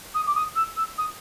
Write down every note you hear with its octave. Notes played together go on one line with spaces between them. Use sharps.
D#6
D6
D#6
E6
E6
D#6